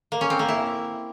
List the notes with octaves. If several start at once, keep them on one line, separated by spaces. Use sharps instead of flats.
A#3
C#4
C4
A#3
E4